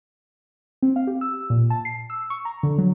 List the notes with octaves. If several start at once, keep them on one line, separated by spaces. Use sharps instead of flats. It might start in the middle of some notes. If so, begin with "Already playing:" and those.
C4
F5
G4
E6
A#2
A5
C7
E6
C#6
A#5
D3
F#3